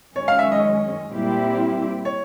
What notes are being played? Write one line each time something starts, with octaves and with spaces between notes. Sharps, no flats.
F#2 D#3 G#3 C#4 C#5
F5
E5
D#5
A#2 G3 C4 E4 G4
C#5